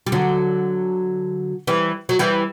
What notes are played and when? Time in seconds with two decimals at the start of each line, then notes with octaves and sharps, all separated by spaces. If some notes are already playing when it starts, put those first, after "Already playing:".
0.06 G3
0.12 D3 F#3
1.67 E3 G3
2.09 F#3
2.19 E3 G3